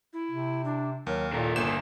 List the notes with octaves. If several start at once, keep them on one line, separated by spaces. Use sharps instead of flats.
E4
C3
D4
D#2 F#3 A#4
A#2 C#3 A4 A#4
G1 A#3 E7